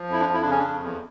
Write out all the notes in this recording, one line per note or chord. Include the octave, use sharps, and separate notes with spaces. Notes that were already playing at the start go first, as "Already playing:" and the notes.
Already playing: F3
F2 E4
D4
F2
E4
D4
C#3 C#4
D4
F2
E2